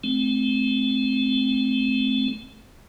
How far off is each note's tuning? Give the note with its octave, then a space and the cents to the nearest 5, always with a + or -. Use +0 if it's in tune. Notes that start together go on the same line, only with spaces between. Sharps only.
A3 -30 C4 +0